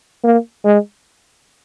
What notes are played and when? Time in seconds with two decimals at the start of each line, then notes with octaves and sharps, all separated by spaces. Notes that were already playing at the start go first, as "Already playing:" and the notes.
0.24 A#3
0.65 G#3